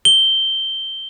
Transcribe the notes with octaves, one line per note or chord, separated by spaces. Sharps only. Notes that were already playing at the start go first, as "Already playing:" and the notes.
G7